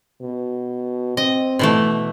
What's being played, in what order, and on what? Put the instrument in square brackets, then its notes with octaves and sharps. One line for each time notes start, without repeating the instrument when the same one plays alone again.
[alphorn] B2
[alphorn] C4 [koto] D#5
[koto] B2 E3 A3